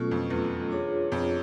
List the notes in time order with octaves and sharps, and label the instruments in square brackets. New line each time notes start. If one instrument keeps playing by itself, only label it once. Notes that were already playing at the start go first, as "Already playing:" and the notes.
Already playing: [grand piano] B2 [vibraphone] F#3 A3 C#4 F4 A4
[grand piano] F2
E2
[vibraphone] D4 F4 G#4 C#5
[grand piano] F2